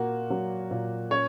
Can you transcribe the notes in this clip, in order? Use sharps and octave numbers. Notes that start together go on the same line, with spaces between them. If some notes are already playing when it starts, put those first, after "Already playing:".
Already playing: A#2 A#3 F#4
F#3
A#2
C#4 C#5